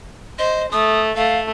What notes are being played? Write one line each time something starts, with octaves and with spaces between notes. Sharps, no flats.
C5 D#5
A3 D#6
A3 F5